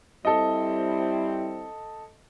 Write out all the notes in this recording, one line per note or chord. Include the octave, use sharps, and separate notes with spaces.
G3 C4 E4 A4 D#5